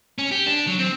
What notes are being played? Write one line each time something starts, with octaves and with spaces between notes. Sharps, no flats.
C#4
G4
D4
F#3
C4